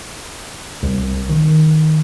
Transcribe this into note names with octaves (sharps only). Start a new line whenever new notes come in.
C2
D#3